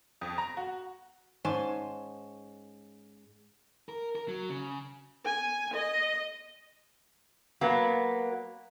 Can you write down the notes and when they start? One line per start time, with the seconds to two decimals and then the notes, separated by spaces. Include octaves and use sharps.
0.21 F2
0.38 A#5
0.57 F#4
1.45 G#2 C#4 G#5 A5 C6
3.89 A#4
4.16 A#4
4.28 F#3
4.50 C#3
5.25 G#5
5.74 D#5
7.61 F#3 A#3 B3